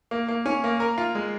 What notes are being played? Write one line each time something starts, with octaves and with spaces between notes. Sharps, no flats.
A#3
A#3
C#4
A#3
A#4
F4
G#3